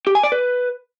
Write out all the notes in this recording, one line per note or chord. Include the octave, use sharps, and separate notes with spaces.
G4
G#5
D5
B4